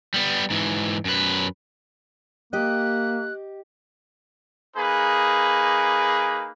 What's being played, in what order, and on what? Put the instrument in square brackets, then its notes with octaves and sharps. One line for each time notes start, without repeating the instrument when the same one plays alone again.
[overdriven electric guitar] G3 B3
G#2 E3
F#2 B4
[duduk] A#3 [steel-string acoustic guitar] G4 D#5 [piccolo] F#6
[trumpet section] A#3 D#4 G#4 B4